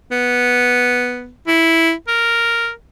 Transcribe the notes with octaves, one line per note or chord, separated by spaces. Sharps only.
B3
E4
A#4